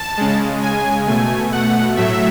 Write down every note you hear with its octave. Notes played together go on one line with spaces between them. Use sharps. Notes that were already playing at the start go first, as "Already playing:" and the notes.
Already playing: A5
C#3 G#3
G#5
B2 A3 G#5
F#5
A2 F#3 A3 E5